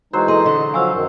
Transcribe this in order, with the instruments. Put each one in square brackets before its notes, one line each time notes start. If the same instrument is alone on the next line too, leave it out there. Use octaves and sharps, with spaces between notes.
[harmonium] E3 G#3 D#4 [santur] F#3 C5
[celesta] A4 C6 [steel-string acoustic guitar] D#5
[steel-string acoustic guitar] D3 [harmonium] D#5
[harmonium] F3 F#3 F5 [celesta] G#5 C#6 E6
[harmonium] F#2 D#3